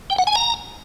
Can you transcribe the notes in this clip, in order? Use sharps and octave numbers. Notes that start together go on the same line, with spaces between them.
G5
F#5
G#5
A#5